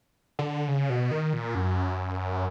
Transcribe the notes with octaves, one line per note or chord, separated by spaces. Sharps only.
D3
C#3
B2
D#3
A#2
F#2